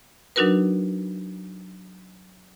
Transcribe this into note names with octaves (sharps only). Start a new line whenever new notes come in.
F#3 D4 D#4 F#4 A#4 B4